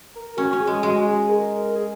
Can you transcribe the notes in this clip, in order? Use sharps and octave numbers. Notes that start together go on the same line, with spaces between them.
A#4
C#4 F#4
C#4
G#4
G#3
G#3 F#4
G#4
A#4
G#4